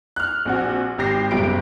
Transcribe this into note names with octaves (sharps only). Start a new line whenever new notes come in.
F6 F#6
A#1 C4 F#4
G#1 G4 A#6 C7
F#1 B1 G3 G4 D7